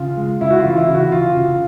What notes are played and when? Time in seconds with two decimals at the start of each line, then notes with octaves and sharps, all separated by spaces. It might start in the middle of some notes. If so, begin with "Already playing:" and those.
Already playing: C#3 F4
0.17 G#3
0.41 C#3 E4
0.50 F#4
0.59 F4
0.65 E3
0.77 E4
0.89 C#3
0.95 F#4
1.12 C#3 F4
1.37 C#3